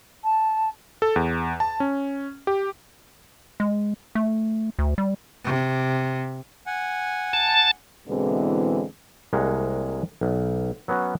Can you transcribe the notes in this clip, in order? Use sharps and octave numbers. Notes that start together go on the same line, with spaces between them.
A5
A4
E2
A5
C#4
G4
G#3
A3
D2
G3
C3
F#5 G#5
A5
E2 B2 D3 E3 G#3 C4
C2 G#3 A#3 F#5
B1
F#3 B3 C#4 F#4